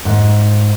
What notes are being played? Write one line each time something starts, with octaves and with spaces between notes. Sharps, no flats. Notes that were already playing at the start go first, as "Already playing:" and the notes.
G#2